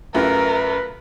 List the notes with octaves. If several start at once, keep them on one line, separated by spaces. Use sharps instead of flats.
F#2 A3 F4 G4 A#4 B4